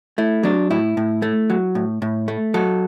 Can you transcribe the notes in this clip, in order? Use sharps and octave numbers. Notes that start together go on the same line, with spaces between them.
A3 E4
F#3 D4
A2 E4
A2
A3
F#3
A2
A2
A3
F#3 A4